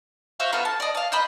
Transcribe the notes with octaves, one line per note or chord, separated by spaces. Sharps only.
F#4 C5 E5 F5
B3 F#4 A4 F5
A5
D5 D#5
F5 A5
C5 D#5 B5